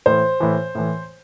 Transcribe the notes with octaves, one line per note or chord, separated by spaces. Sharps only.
A2 E3 C5
A2 E3
A2 E3